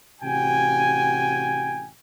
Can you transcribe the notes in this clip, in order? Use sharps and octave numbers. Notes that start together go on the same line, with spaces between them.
A1 C3 F#4 G5 G#5